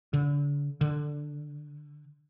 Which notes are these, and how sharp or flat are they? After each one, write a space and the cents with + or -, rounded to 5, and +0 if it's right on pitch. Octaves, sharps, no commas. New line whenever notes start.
D3 -35
D3 +5